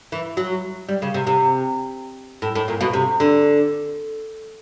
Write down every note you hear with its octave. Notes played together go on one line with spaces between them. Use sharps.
E3
F#3
G3
C#3
C3
C3
A2
A2
A#2
B2
C3
D3